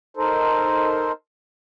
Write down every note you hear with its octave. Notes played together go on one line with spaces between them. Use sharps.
D#4 A4 A#4 C5